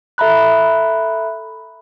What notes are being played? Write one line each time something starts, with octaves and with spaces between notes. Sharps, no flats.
A4 E5 A#5 B5 F#6